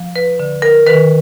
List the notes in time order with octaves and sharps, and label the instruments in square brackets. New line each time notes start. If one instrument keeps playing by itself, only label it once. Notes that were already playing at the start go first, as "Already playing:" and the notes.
Already playing: [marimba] F3
B4
D3
A#4
D#3 B4